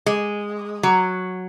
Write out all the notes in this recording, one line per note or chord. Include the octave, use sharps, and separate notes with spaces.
G#3
F#3